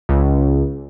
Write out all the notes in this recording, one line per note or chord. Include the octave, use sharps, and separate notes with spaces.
C#2